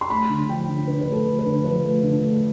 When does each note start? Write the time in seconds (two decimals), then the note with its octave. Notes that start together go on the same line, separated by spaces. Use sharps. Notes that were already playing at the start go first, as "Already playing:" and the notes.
0.01 C6
0.10 A3 B5
0.29 D3
0.49 F3 G5
0.68 D3
0.87 D3 B4
1.01 A3 B4
1.12 A4
1.25 A3
1.39 B4
1.45 D3
1.64 F3 B4
1.84 A3
2.03 D3
2.22 A3